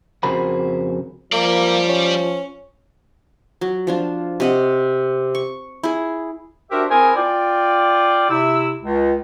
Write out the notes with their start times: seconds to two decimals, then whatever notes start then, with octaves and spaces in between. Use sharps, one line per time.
0.23 F2 C#3 F#4 A#4 C5 B5
1.32 F3 G3 A#3 D5
1.88 C#4
3.61 F#3
3.87 F3 D4 F4
4.40 C3 D#5 F#5
5.35 C#6
5.83 E4 G#4
6.71 D4 F#4 G4 A#4 C5 E5
6.90 C4 E4 G#4 A#4 C5 G#5
7.16 F4 D5 G5
8.30 C3 E4 E6
8.83 C#2